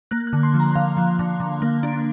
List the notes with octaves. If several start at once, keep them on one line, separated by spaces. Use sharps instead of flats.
A#3 F#6
F#6
D3
C6
F3
A#5
D3 F5
F3
D3
D3
A#3
D4